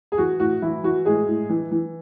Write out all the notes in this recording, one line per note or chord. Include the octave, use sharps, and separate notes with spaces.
G#4
E3 F#4
A2 F#4
E3 E4
E3 F#4
A2 G#3 G#4
A2
E3
E3